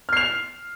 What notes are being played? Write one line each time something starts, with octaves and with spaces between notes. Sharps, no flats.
F6 C7 F7